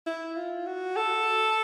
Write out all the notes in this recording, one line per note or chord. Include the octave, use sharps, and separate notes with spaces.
E4
F4
F#4
A4